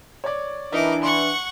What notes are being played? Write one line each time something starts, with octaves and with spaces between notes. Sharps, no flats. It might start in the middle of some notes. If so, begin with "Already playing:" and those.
C#5 D5
E3 D4 D#4 A#4 D#5 E5 D6
F#5 C6 C#6